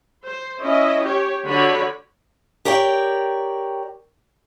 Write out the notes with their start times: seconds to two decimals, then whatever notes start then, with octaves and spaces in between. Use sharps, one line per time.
0.23 C5
0.59 C#4 E4 D#5
1.03 G4 C#5
1.45 D3 F#4 C#5 D5 B5
2.65 G4 A#4 C#5 D5 G5